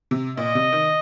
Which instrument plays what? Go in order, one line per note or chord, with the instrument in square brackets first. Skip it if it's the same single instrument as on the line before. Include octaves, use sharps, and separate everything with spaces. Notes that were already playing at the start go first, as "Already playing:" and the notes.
[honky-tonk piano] C3
[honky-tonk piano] A#2 [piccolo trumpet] D#5
[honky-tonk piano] C3
D#3